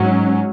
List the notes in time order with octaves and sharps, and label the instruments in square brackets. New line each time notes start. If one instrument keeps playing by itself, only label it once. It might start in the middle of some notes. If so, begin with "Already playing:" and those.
Already playing: [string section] G#2 F#3 C#4